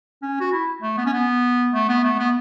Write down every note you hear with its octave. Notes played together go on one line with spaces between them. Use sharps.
C#4
F#4
E4
A3
B3
C#4
B3
A3
B3
A3
B3